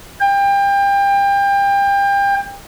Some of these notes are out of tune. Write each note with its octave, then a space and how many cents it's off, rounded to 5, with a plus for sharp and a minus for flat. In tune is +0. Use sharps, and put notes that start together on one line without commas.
G5 +30